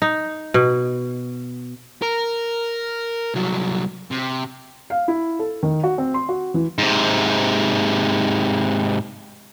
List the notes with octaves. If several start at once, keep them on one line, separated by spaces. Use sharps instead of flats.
D#4
B2
A#4
C2 F#3
C3
F5
E4
A4
D#3
F#4
C4
C6
F#4
E3
G#2 C3